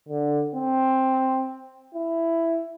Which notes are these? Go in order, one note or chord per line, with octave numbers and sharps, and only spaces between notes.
D3
C4
E4